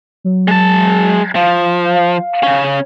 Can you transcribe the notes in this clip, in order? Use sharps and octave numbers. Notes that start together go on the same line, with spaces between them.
F#3
G#3 A5
F3 F5
C#3 C#4